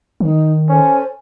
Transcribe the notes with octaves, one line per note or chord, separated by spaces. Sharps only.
D#3 D#4
C#4 A4 C5 G#5